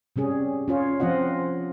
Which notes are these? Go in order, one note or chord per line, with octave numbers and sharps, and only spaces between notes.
C3 G3 C#4 G#4
C#4 F4 C#5
F3 C4 F4 D#5 F#5